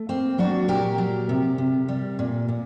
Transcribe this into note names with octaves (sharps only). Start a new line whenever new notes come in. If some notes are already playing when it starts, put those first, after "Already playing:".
Already playing: A3
A#3 C4
F#3 D4 F#4
A#2 G4 A#4
F#3
C3
C3
G3
A#2
A#2